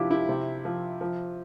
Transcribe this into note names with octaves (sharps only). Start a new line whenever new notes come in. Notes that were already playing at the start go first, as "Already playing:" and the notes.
Already playing: C3 F3 D4 E4 F4 G4
E4 G4
C3
F3
F3